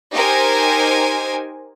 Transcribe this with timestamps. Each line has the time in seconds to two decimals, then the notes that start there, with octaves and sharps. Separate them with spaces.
0.13 D#4 G4 A#4 C5 G#5